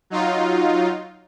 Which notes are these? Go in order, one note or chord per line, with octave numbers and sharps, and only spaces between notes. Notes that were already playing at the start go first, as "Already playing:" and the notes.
F#3 D#4 F4